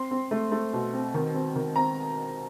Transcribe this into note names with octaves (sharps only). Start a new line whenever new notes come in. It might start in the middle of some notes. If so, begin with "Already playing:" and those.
Already playing: C4 C6
C4
A3
A3
B2
C4
D#3
C4
D#3
C4 A#5